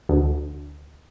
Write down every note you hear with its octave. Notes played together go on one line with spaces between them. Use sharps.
D2